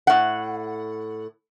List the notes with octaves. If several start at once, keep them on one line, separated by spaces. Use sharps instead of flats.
A2 F#5